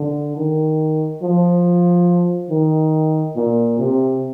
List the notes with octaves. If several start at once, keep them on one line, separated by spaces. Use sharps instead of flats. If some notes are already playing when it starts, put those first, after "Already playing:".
Already playing: D3
D#3
F3
D#3
A#2
C3